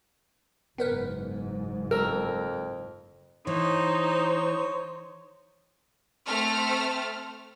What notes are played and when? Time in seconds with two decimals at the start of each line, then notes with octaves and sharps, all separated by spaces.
0.78 F#1 G#2 B3 A#4 B4
1.91 F2 A#4 E6
3.47 E3 D#4 C5 C#5
6.26 A3 C4 A4 F6